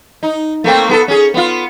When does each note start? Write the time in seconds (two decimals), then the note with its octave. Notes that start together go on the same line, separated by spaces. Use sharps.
0.23 D#4
0.64 A3 A#3 C4
0.89 B3 G#4 A4
1.08 C#4 G#4
1.34 B3 F4